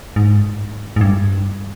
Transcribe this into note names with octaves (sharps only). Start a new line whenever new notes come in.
G#2
G#2
G2